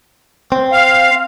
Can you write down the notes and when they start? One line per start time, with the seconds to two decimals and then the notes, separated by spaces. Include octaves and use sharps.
0.52 C4
0.72 F5